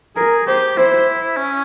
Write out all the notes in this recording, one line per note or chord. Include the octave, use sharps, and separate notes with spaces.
G#4 A#4
G4 C5
E4 C5
C#4